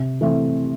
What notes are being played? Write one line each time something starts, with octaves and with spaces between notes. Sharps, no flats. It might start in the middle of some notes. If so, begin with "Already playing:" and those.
Already playing: C3
E3 A3 C4